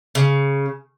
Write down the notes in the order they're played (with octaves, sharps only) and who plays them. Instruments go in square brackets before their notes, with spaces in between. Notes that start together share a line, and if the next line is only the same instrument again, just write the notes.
[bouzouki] C#3